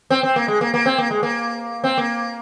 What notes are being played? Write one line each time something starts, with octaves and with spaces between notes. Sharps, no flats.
C4
C4
A#3
G#3
A#3
A#3
C4
A#3
G#3
A#3
C4
A#3